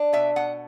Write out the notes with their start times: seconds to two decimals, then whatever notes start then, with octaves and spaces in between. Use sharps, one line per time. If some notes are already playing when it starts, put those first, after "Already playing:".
Already playing: D4
0.13 B2 E5
0.36 B2 F#5